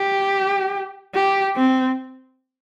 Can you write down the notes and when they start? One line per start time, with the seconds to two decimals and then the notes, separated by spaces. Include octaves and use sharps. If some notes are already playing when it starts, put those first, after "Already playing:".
Already playing: G4
1.15 G4
1.56 C4